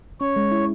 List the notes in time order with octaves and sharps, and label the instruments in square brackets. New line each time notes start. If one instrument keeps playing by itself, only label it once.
[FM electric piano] C#4 [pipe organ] C#5
[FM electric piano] G#3
E4